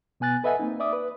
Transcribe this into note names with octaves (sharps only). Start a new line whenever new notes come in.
B2 B3 G#5 F#6 A6
A4 B4 D#5 E5 F#5 G#5
A#3 C4 D#4
D5 E5 D6 D#6
B4